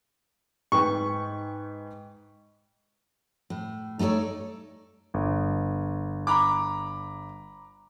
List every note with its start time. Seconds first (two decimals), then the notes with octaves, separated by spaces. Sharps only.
0.72 G#2 B4 G5 C#6
3.50 A2
3.99 A3 D#4 A4 C#5 D5
5.14 G1
6.27 A#5 B5 D6